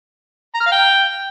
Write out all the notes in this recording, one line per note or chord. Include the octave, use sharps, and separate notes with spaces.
A#5
F6
F5
G5